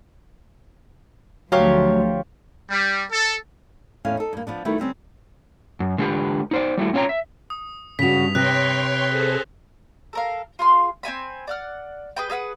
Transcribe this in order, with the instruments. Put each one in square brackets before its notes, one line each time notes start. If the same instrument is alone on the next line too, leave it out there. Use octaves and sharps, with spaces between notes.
[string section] D2 F3 [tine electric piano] F#3 [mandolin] F4 G4 C#5
[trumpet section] G3
A4
[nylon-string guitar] E2 A2 A3 C#4 F5
D#4 A4
G2 A#3
F3 B3 D4
D#3 G3 A3 E4 F#4 B4
D3 G3 C4 C#4
[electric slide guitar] F#2
D3 G#3 A3 F4 G4 B4
D#4 C5 D5
G3 A3 E4 F#4
C4 C#4 F4 C#5 G5 A#5
E5
[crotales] D#6
[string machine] G2 [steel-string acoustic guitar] C#3 F#4 [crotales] B6 F7
[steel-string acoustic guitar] C3 B4 [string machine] C#5 G5 C6 [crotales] F#6 A#6
[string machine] G#4 A4 C5
[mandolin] A4 A#4 F5
F4 G#4 C6
C4 E4 G#5 B5
D5 F#5 F6
G#4 B4 G5
G#4 B4 F5 F#5